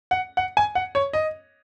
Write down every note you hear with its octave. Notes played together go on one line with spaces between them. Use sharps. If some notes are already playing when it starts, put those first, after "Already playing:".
F#5
F#5
G#5
F#5
C#5
D#5